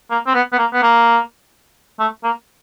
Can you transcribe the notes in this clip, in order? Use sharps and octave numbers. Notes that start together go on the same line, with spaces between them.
A#3
C4
B3
B3
A#3
B3
A#3
A3
A#3